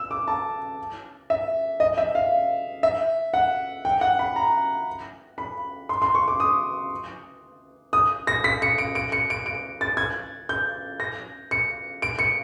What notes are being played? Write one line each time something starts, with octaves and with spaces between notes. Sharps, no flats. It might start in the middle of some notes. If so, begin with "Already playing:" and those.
Already playing: E6
D6
A5
E5
D#5
E5
F5
E5
F#5
G5
F#5
B5
A#5
B5
C6
C6
C#6
D6
D#6
D#6
A#6
B6
C#7
D7
D7
C#7
D7
D7
A6
G#6
G6
A#6
C#7
D7
C#7